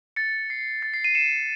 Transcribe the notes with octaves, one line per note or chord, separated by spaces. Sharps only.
A6 C#7
C7
A6
C7
C7 D#7
C#7 E7